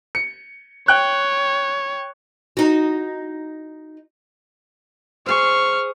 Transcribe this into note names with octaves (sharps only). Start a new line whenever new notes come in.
C#7
C#5 G5 F#6
D#4 F#4
G#4 C5 C#6 F6